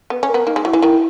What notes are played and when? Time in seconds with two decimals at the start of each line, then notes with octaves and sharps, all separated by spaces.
0.10 B3 B4
0.23 C#4
0.29 A#4
0.34 B3
0.47 A#3 D#4
0.56 G#3
0.65 F#3 E4
0.73 E3
0.82 D#3 E4